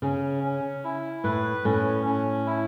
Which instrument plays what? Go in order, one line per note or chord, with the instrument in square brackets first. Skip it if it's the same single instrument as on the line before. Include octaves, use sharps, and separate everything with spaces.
[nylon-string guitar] C#3 [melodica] C#4
[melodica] C#4
E4
[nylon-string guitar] A2 [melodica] B4
[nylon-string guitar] A2 [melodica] C#4
[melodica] C#4
E4